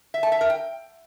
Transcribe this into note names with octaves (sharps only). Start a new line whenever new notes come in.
E5
A5
E5
A#4
G5